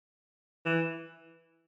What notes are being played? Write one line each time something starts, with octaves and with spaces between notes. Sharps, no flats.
E3